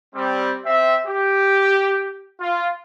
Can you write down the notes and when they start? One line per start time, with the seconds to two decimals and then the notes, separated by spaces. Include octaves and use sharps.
0.15 G3 C4
0.66 C4 E5
1.07 G4
2.40 F4